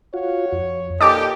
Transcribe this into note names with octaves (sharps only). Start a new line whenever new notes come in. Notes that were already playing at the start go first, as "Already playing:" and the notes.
F4 F#4 C#5
F2
A#2 D#4 G4 A4 D#5 A5 D6